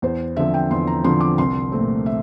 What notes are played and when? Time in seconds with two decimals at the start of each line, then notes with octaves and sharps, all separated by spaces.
0.02 E2 C5
0.36 D3 F3 C4 E5
0.54 G5
0.71 E2 C6
0.87 A#5
1.04 D3 F3 C4 C6
1.21 D6
1.38 C2 C6
1.72 A#2 A3 C4
2.06 E5